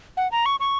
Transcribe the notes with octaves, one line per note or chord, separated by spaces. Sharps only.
F#5
A#5
C#6
C#6